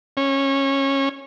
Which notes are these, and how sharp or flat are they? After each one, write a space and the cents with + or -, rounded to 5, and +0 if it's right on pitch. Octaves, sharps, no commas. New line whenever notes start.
C#4 -20